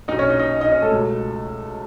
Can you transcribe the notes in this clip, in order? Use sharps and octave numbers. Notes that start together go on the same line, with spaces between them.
B1 B2 D#4 D#5
C#4 C#5
D#4 D#5
D#4 D#5
D#4 D#5
C#4 C#5
A3 A4
C#2 B2